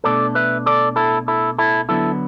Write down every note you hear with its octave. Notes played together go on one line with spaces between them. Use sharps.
B2 A3 D4 A4 D5
B4 E5
A4 D5
E4 A4
E4 A4
E4 A4
D3 F#3 B3 E4 A4